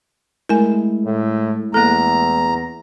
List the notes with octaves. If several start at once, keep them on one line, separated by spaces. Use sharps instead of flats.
G#3 A3 E4 A#4 G#5
A2
E2 A#3 A4 A#5